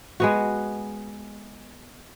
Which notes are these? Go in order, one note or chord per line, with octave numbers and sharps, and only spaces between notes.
G#3 B3 F#4